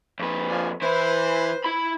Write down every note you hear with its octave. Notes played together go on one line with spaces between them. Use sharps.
F2 B4
F3 D5 G#5
E3 E4 B4 C5
E4 B5